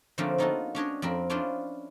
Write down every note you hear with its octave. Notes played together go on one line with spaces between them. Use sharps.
D3 F3 A3 A#3 C4 C#4
A#3 B3 D#4 F4 F#4 A4
C#4 D4 C#5 D#5
F2 C4 A#4 B5
C#4 D4 E4 F4 C5 D5